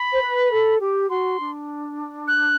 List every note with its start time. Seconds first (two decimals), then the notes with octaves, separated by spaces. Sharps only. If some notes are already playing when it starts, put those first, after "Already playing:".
Already playing: B5
0.12 C5
0.21 B4
0.52 A4
0.80 G4
1.09 F#4 C6
1.40 D4
2.28 F#6